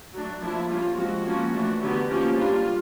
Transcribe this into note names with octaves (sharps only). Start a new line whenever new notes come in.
F#3 A3 D4
F3 A#3 D4 E4
G3 A#3 C#4 F4
F3 G#3 C4 F#4
F3 A#3 C#4
E3 A3 D4
D3 F#3 B3 D4 G4
F3 A#3 C#4 G4
G3 A#3 D4 F4